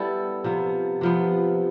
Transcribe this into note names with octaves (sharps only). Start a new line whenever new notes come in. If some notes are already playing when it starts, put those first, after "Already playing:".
Already playing: G3 B3 E4 A4
C3 F3 B3
C3 F3 B3